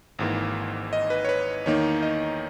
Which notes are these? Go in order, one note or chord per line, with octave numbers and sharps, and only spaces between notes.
G#1 G#2 E3 A#3
D#5
B4
C#5
B4
E2 D#3 A#3 D#4 C#5
D#5